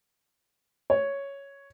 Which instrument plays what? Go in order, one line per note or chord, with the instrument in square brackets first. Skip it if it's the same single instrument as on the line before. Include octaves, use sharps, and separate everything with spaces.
[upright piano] C#5